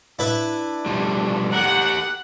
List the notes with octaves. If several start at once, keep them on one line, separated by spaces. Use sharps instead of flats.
D4 E4 B4 E5
B2 F3 G3
G4 A#4 F#5